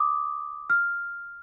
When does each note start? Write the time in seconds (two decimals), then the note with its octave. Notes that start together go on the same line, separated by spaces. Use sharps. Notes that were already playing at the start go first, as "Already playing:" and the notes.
Already playing: D6 D#6
0.70 F6